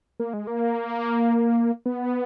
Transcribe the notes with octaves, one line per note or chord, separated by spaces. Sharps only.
A#3
G#3
A#3
B3